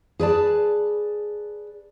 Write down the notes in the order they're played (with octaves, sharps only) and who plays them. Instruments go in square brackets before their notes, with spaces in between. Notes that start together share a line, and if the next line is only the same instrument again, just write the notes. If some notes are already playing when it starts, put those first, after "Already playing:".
[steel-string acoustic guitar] G#4 B4 D5 A5